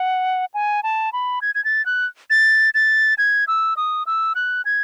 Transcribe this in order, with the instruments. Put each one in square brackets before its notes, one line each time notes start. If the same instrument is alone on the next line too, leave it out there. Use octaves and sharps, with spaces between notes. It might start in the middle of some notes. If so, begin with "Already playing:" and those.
Already playing: [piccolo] F#5
G#5
A5
B5
G#6
G#6
A6
F#6
A6
A6
G#6
E6
D#6
E6
F#6
G#6